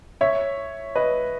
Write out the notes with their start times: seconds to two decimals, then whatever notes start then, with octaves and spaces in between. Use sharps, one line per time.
0.21 C#5 E5
0.95 B4 D#5